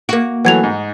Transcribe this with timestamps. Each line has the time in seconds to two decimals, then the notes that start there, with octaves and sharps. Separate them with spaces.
0.09 A#3 F#4
0.45 E3 F#3 A3 F#5 G#6 F7
0.63 G#2 D#4